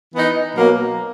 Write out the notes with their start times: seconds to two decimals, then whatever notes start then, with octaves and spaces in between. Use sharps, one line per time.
0.14 E3 B3 D#4
0.55 B2 F#3 A#3